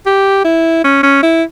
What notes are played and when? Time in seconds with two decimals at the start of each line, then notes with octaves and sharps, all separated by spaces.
0.06 G4
0.45 E4
0.84 C#4
1.03 C#4
1.23 E4